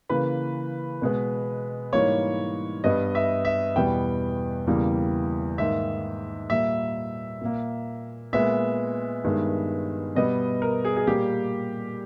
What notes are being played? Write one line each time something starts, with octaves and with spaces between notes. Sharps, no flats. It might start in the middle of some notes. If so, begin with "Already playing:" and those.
C#3 E3 A#3 B4
B2 G#3 B3
G#2 E3 G3 A#3 C#5
G2 G3 B3 D#5
E5
E5
E2 B2 G3 B3 G5
E2 C#3 E3 G3 A#3
G#2 D#3 A#3 E5
A#2 G3 A#3 E5
A#2 A#3
A#2 G#3 B3 E5
G2 D#3 G#3 B3
B2 G3 B3 D#5
A#4
G#4
G#4
A#2 G3 A#3 G4